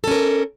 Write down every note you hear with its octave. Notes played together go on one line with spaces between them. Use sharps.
C#4 A4 A#4